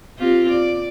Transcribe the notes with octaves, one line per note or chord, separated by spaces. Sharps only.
C4 F4 G4
D5